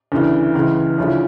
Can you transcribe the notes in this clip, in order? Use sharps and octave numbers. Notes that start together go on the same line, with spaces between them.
D2 C#3 E3
C#2 C#3 E3
D2 C#3 F3 C#4 E4